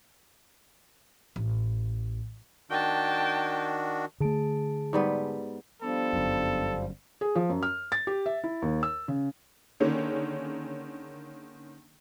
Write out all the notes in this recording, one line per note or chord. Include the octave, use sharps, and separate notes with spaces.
A1
D#3 D4 F#4 G5 A5
D3 A3 G#4 A5 D7
G#2 G3 B3
F3 G3 B3 D4 A4
G1 F#2
G#4
F3
F#2
F6
A6
G4
E5
E4
D#2
E6
C#3
D3 D#3 A#3 C#4 G#4